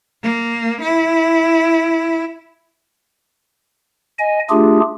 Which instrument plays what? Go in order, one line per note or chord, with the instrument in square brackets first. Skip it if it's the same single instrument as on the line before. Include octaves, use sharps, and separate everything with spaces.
[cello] A#3
E4
[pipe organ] D#5 G#5
A3 D4 F4 G4 G#4